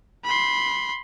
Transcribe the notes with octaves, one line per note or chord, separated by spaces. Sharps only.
B5 C6